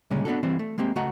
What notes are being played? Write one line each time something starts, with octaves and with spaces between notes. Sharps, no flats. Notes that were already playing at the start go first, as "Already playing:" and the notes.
D2 A#2 C#3 G3 G#3 C#4
B3 D4 F#4 A4
E3 G3 C4
A3
G#3 A#3 C4 G4
C#2 A3 F#4 D#5 F#5 A#5